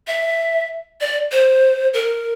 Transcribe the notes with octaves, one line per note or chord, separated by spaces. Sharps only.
E5
D5
C5
A#4